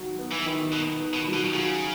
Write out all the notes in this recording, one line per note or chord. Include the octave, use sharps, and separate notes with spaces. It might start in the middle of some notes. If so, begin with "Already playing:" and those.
Already playing: D#3 F#3 F#4
B3
E3
D#3
B2 B3
D#3
B2
F#3
B2
C#3 F#4